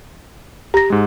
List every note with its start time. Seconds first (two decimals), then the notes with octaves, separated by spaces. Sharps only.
0.74 G4 A#5 A#6
0.90 G#2 G#3